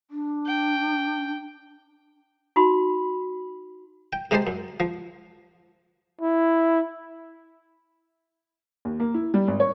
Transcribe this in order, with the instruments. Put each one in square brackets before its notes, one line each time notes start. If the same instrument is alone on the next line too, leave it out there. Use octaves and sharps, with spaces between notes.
[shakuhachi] D4
[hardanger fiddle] G5
[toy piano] D#4 F#4 B5 C6
[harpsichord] G5
C3 G#3 D#4 G4 C5 A5
F#2
F3
[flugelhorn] E4
[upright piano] D#2
A#3
E4
G3
G#1
C#5